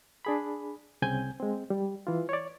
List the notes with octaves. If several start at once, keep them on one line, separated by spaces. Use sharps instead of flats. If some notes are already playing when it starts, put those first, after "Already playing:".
D4 G#4 B5
C2 C#3 C4 G#5 G6
G#3 C4
G3
E3 F4
C#5 D5